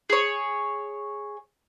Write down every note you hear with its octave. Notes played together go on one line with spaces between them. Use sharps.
G#4 C#5